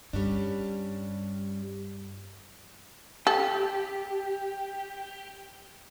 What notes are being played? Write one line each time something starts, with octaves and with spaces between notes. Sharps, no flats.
G2 G3 C#4 D4
G4 A4